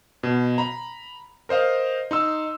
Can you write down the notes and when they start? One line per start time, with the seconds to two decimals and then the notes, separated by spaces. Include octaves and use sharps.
0.23 B2
0.58 A#5 B5
1.49 A#4 C5 D#5 F5
2.11 D#4 C6 E6